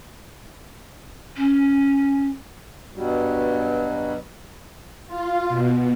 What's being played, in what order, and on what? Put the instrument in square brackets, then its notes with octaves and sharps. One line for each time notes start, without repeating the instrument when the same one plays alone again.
[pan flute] C#4
[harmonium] G2 B2 F#3 G3
[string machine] F4
B2